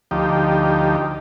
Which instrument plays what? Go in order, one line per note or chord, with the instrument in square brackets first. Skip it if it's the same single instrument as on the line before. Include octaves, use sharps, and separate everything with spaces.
[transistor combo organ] D2 F3 D#4 G4